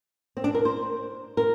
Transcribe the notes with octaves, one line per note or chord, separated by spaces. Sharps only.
C4
D4
A#4
C5
A#4